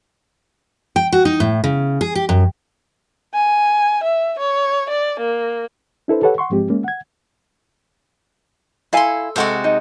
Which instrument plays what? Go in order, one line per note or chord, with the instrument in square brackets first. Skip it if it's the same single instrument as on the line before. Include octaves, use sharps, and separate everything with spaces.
[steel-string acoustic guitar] G5
F#4
D#4
A2
C#3
G#4
G4
F#2
[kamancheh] G#5
E5
C#5
D5
A#3
[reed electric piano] D4 E4 A4 B4 C5
G4 A4 B4 C#5 F#5
F#5 C6 C#6
G#2 F3 G#3 C4 G4
G#3 A#3 C#4
F#5 G#6
[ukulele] E4 F5 G#5 [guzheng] A4 C6
[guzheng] C3 G#3 F#4 [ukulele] A4 F#5
[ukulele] D#4